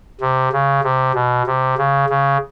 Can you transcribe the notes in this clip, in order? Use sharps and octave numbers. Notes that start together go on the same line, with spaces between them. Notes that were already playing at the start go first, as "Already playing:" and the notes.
C3
C#3
C3
B2
C3
C#3
C#3